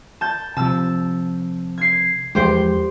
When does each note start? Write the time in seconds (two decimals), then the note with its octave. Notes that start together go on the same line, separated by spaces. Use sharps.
0.21 A5 G6
0.57 C3 F3 A5 E6
1.78 G#6 C7
2.35 E2 F3 G#3 G4 C5 G5